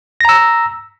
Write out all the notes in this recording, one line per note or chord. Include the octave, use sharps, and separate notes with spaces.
A#5 E6 A#6